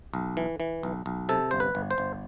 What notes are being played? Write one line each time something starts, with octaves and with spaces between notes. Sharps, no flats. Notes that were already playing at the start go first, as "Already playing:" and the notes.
B1
E3
E3
B1
B1
C3 A4
G1 C5
B4
G1
C5
G1